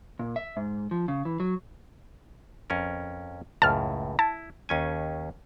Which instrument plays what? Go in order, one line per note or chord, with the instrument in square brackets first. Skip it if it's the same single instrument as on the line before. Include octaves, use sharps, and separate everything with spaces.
[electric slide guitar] A#2
E5
G#2
F3
C#3
E3
F#3
[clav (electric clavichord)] F2 C#4 A#4
[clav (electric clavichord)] C#2 F#2 A2 [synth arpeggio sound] A5 F6
[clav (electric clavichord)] E4 [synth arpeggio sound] A5
[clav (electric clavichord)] D#2 C#4 G#5